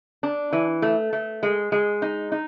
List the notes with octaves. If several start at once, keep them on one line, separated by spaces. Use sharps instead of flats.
D4
E3
A3
A3
G#3
G#3
D#4
D#4